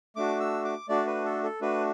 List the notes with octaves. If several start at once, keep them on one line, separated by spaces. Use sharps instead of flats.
A3 D4 F#4 D6
E6
D6
A3 D4 F#4 D5
B4
A4
A4
A3 D4 F#4 B4